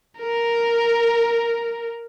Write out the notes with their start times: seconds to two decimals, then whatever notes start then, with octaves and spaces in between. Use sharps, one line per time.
0.19 A#4